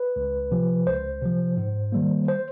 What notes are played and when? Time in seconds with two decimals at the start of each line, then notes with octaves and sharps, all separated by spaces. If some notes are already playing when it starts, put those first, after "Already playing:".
Already playing: B4
0.16 C#2
0.51 C3 F3
0.87 C#2 C5
1.21 C3 F3
1.57 G#2
1.92 D#3 G3 A#3
2.28 C5